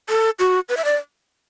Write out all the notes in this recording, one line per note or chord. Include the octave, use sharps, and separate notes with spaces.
A4
F#4
B4
E5
D5